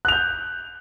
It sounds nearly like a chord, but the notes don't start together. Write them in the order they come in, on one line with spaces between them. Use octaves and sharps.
F#6 F7 G6